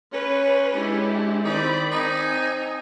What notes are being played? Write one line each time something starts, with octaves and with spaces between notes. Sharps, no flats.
C#4 B4 C#5
G#3 D4 E4 G4
D#3 C4 D#4 D5 B5
C4 D#4 G#5